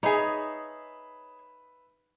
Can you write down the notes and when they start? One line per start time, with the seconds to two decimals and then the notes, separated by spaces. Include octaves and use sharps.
0.03 D#4 G#4 B4 C#5 E5 B5